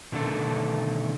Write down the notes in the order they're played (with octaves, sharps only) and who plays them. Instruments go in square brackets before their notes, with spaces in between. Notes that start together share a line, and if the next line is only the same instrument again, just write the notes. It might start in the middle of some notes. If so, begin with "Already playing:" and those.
[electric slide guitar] B2 D3 D#3 A3 D4 A4